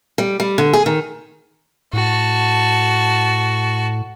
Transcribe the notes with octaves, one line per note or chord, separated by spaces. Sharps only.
G3
G3
D3
G#4
D#3
A2 F#4 A5